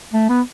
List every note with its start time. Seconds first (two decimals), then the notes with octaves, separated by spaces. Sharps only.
0.13 A3
0.30 B3